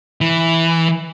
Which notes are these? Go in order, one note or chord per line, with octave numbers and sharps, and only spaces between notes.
E3